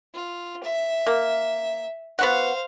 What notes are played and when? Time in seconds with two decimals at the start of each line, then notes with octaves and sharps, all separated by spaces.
0.14 F4
0.64 E5
1.07 A#3
2.19 B3 F#4 C5 F5 F#5